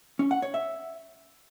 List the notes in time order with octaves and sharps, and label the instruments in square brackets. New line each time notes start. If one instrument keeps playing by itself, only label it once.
[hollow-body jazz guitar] C#4
F#5
C#5
E5